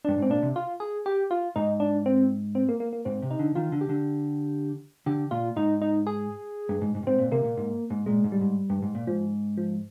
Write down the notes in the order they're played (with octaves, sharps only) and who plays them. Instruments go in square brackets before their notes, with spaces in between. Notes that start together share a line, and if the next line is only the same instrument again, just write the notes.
[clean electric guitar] G2 [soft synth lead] D4
[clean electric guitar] G#2
[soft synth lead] C4
[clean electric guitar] A#2 [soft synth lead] D4
[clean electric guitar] C3
[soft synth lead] F4
G#4
G4
F4
[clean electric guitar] G#2 [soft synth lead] D#4
[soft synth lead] D4
C4
C4
A#3
A#3
A#3
[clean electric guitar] G#2 [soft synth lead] C4
[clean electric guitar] C3
[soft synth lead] D#4
[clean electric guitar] D3
[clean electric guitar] D#3 [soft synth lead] F4
[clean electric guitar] D3
[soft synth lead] G4
[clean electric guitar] D3
[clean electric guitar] D3 [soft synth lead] G4
[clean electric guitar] A#2 [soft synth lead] F4
[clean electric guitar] G#2 [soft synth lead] D#4
[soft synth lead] D#4
G#4
[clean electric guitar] G2
G#2
G#2
G2
[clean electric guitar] G#2 [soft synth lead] C4
[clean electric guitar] A#2
[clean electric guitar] C3 [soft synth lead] A#3
[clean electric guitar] A#2
G#2
G#2
[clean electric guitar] A#2 [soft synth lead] G#3
[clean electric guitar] G#2
[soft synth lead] G3
[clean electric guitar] G#2
G2
G#2
A#2
[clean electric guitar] G#2 [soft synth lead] F3
[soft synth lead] F3